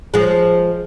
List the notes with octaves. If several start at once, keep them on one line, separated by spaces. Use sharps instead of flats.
F3 G#3